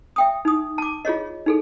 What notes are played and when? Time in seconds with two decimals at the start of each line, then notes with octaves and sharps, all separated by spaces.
0.16 E5 G5 D#6
0.45 D#4 D#6
0.78 A5 D6
1.05 F4 G#4 C#5 D#5
1.46 D#4 G#4 A4